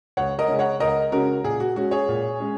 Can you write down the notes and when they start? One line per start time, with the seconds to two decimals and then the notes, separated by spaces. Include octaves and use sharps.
0.17 C#2 C#5 F#5
0.38 A#4 D#5
0.48 C#3 G#3 C#4
0.59 C#5 F#5
0.80 C#2 A#4 D#5
1.12 C#3 G#3 C#4 F#4 A#4
1.44 A#2 G#4
1.60 F#4
1.76 G#3 C#4 F#4
1.91 G#4 C#5
2.08 A#2
2.40 G#3 C#4